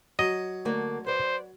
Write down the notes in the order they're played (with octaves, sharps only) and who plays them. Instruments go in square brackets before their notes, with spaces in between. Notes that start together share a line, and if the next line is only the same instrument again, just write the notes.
[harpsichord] F#3 [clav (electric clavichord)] D#5
[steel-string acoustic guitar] D3 A3 A#3
[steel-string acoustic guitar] B4 D5 [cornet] C5